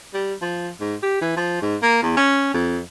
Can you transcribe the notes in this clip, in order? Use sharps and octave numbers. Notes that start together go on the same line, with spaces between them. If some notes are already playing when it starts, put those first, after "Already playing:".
G3
F3
G#2
G4
E3
F3
G#2
A#3
E2
C#4
F2